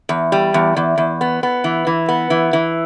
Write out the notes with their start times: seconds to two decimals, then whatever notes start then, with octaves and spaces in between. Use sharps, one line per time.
0.09 E2
0.32 G3
0.54 E2
0.77 E2
0.98 E2
1.21 B3
1.43 B3
1.64 E3
1.87 E3
2.09 B3
2.30 E3
2.53 E3